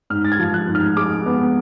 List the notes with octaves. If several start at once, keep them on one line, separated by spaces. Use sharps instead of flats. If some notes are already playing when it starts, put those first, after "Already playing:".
G#2 F6
A6
G#6
F3
F#6
G#2
F6
G#3 D6
B3